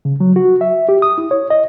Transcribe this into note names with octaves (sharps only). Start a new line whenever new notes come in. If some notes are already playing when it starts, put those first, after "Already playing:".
C#3
F#3
F#4
E5
G4
D#6
E4
C#5
D#5